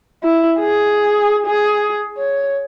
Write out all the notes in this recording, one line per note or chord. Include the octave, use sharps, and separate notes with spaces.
E4
G#4
G#4
C#5